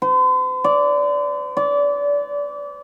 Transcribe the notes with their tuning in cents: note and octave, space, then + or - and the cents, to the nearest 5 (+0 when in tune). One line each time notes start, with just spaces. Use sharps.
C5 -45
D5 -20
D5 -30